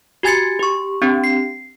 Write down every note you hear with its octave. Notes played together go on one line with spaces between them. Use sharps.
F#4 G4 G#5 G#6 A6 C#7
G4 C#6
C4 D4 G4
C7